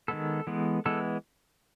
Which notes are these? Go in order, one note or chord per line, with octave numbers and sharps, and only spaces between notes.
D#3 G#3 B3 A4
E3 G#3 B3
E3 G#3 B3 A4